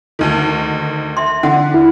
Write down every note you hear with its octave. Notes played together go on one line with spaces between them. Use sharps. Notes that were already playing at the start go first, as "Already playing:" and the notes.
D2 D#3
E5 C6
D3 F#5
E4